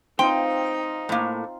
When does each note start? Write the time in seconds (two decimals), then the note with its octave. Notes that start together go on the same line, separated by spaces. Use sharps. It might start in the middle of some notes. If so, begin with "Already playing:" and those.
0.19 C4 D#4 F4 G5 C6
1.09 A2 A#3